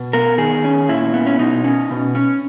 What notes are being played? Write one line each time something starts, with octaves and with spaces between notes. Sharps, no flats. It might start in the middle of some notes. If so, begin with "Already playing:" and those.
Already playing: B2
B3 A#4
D#3 G#4
C#4
A#2 E4
B3
C#4
B2 D#4
C#4
B2
C#4